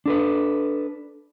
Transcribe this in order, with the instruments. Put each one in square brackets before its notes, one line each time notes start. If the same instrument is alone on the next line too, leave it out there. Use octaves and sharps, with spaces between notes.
[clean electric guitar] D4 A4 B4